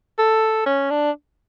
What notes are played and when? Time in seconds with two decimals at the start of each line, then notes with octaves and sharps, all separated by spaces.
0.18 A4
0.66 C#4
0.90 D4